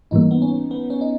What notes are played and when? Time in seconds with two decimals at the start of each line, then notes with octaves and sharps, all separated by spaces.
0.11 G#2 E3 G3 A#3 D#4
0.31 B3
0.42 C#4
0.71 B3
0.90 C#4
1.01 D#4